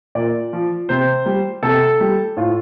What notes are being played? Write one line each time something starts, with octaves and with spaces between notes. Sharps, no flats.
A#2 D5
F3
C3 C5
G3
C3 A4
G3
A2 F4